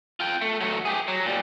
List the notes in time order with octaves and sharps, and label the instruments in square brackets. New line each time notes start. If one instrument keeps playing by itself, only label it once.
[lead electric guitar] F4 G5
A3
F#3 A3
G4 G#4
F#3
A#2 G3